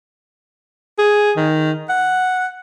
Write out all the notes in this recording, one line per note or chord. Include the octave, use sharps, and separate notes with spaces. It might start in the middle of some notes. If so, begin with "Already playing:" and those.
G#4
D#3
F#5